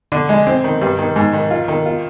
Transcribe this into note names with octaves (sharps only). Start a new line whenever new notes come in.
D3
G#3
C4
D#3
G2
D#3
G#2
D#3
F4
D#3
F4